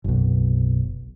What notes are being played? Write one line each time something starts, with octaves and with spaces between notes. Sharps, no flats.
F#1 B1